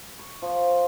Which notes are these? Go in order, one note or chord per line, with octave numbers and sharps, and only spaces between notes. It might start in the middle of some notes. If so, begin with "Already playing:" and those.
C#6
F3